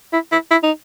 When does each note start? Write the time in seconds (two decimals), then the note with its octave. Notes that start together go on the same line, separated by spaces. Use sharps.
0.13 E4
0.32 E4
0.51 E4
0.63 D#4